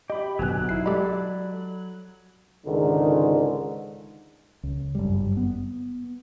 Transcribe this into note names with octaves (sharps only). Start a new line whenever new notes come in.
G4 D#5 B5
G#1 F#2 B2 D3 F#3 C4 G#5 F#6
D#4 E4 C7
G#3 G4 A4 D5 B5
C#2 G#2 D3 D#3
C#2
G1 F#2 G3
B3